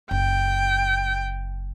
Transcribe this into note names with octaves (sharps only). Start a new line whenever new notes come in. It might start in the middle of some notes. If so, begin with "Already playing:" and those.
F#1 G5